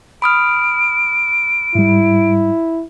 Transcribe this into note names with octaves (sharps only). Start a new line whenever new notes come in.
B5 D#6 F6 D7
G#2 G3 E4